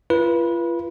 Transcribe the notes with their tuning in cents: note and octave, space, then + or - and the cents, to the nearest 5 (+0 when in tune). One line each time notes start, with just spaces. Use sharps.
F4 -40 B4 -25